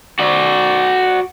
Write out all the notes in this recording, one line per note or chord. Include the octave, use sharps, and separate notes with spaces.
F#4 D5